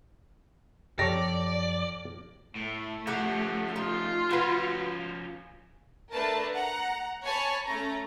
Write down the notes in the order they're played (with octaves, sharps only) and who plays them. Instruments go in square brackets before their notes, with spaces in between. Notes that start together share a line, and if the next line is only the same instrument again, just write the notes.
[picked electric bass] F#2 F3 [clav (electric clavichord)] G4 A4 C#5 [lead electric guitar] D5 [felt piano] A#6
[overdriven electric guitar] A2 [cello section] A3
[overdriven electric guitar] F3 C#4 [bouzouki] G4 F#5
[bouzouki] D#4 [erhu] F4
[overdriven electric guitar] F3 C#4 [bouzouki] F#4 B4
[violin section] A3 D4 A#4 B4 A5
F#5 A#5
C#5 G#5 A5 B5 C#6
A3 C#4 A#5